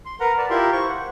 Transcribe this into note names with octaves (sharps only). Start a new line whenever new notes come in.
C6
A#4 B4 F#5 A#5
B4 D5 A5
E4 F4 G4 A#4 E5 C6
C5 C#6
F#5